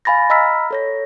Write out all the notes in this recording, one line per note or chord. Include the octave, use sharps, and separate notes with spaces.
F5 G#5 B5 A6 A#6
D#5 A#5 B5 E6 F6 B6
A4 C#5 A#6